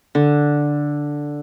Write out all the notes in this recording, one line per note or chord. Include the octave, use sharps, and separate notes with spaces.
D3